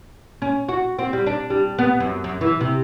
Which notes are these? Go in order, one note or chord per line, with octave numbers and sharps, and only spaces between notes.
C#4
F#4
C4
G3
D4
G3
B3
F#2
F#2
E3
C3